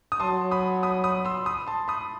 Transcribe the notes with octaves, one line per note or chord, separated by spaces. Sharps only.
D#6
F#3 A5 C6
B5 D#6
B5 D#6
B5 D#6
C6 E6
B5 D#6
A5 C6
B5 D#6